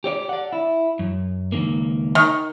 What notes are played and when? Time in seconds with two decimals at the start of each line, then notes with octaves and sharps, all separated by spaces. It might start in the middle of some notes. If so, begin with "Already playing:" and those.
0.04 G4 C#5 D5
0.29 D5 F#5
0.53 E4
0.99 F#2
1.52 C#2 D#3 A#3
2.15 D#3